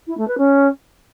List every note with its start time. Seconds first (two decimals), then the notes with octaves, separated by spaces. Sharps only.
0.07 E4
0.17 A3
0.28 B4
0.38 C#4